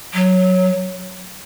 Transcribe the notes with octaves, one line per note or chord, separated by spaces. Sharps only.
F#3